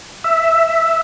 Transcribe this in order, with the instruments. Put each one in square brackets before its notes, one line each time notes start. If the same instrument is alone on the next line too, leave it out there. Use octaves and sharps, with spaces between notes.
[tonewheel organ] E5